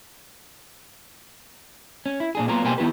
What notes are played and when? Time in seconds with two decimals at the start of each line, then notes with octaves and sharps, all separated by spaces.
2.06 C#4
2.20 E4
2.35 A#2 D4 G#4
2.48 F#3 A#3 B3 F4 A#4
2.64 B2 A#3 G4 C5 G#5
2.78 D#3 B3 E4 G4 B4